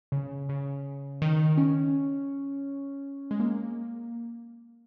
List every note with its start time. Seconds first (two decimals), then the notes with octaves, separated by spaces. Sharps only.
0.12 C#3
0.49 C#3
1.22 D#3
1.57 C#4
3.31 G#3
3.40 A#3